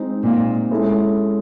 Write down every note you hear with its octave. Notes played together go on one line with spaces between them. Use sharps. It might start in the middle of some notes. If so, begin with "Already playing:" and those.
Already playing: G#3 C4 D#4
A#2
G#3 C#4 E4 A4